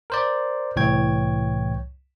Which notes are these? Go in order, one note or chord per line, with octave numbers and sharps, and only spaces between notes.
A#4 C5 D5
C2 A2 E3 C#5 G5 G#6